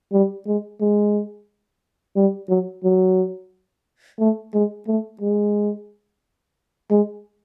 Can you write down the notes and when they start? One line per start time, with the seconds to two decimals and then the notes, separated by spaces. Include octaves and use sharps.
0.13 G3
0.47 G#3
0.81 G#3
2.16 G3
2.50 F#3
2.84 F#3
4.20 A3
4.54 G#3
4.87 A3
5.21 G#3
6.91 G#3